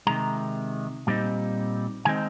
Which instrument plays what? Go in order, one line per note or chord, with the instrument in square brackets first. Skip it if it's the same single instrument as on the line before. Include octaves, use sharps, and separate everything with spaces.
[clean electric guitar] C3 D#3 G#3 A#5
A#2 G3 C4 D#4
D#3 G#3 C4 D#4 G#5